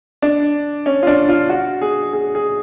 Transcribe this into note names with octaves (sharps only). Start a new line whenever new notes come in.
D4
C#4
F4
D4
F4
F#4
G#4
G#4
G#4